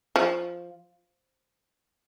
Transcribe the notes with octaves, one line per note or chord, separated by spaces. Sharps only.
F3